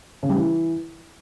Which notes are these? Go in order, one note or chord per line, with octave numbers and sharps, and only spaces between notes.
C#3
G3
E3